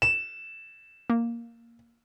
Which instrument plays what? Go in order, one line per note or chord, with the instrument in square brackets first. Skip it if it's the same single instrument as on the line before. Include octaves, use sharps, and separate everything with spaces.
[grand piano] E7
[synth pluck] A#3